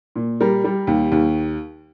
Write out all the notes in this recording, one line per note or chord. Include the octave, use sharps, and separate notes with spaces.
A#2
G3 A#4
G3
D#2
D#2